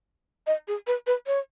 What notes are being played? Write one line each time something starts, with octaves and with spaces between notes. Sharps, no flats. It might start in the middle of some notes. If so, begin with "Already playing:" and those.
D#5
G#4
B4
B4
C#5